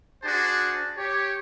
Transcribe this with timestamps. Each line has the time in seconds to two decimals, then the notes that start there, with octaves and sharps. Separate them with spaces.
0.24 D4 F#4 G#4 C5 A5
0.97 G4 C#5